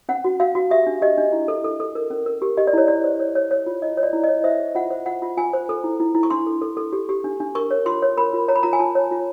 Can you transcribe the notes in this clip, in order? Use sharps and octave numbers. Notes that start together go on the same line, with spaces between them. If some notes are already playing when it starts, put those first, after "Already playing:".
C#4 F#5
F#4
F#4 F5
F#4
G4 E5
D4
G4 D#5
D4
E4
A4
A4
A4
A#4
C#4
A#4
G4
G4 D#5
D5
E4 C#5
E4 D5
C5
C#5
C#5
C#5
F4
E4 D#5
C#5
D5
E4
C#5 D#5
C5 E5
G#4
F4 F#5
C5
F4 F#5
F4
F4 G#5
C5
A4
E4
E4
E4
C#6
D4 C6
A4
A4
A4
G4
G4
D4
D4
A#4 C#6
C#5
F4 C6
C#5
A#4 B5
F4
C#5 A#5
B5
F4 A#5
G#5
F4 A5
C#5
F4